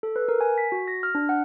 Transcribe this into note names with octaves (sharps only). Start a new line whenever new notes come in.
A4
B4
A#4
G#5
B6
F#4
A#6
F6
D4
F#5